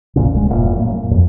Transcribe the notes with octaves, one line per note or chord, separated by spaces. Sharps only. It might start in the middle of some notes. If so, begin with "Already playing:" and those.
A#1 E2 A#2 C#3
D1 C2 C#3 G#3
E1 G2 A#2
F#2 A2 A#3
F2